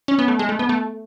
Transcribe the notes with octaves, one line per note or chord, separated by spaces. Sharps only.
C#4
B3
A3
G#3
A3
B3
A3